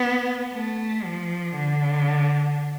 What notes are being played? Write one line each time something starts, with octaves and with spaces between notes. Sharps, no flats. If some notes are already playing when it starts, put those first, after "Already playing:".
Already playing: B3
A3
F3
D3